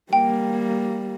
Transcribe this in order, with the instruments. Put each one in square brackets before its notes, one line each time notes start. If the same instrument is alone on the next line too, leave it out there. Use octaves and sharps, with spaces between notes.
[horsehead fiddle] G3 A#3 [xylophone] G5